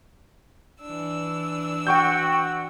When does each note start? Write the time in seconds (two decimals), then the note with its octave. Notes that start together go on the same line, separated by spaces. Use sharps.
0.80 E3 D4 E6
1.87 F#4 G5 C#6 G6